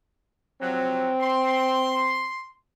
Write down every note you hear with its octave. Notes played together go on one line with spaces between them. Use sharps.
C3 F3 F#3 C4
C6